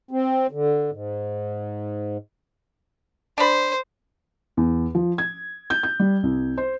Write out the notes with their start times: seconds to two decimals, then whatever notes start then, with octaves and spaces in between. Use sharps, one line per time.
0.11 C4
0.51 D3
0.91 G#2
3.38 D4 C5 B5
4.57 E2
4.95 F3
5.18 G#6
5.70 G6
5.83 G6
6.00 G3
6.23 C2
6.58 C5